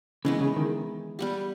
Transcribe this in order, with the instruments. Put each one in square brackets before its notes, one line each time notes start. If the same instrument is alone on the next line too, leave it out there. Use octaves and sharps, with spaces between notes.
[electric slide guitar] C#3 [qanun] E3 G#3 B3
[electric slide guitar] C#3
D#3
[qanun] G3 B3 G4